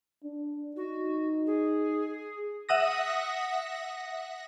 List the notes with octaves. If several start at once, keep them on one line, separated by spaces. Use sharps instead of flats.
D4
D#4 F#4
G#4
E5 F#5 D#6 A#6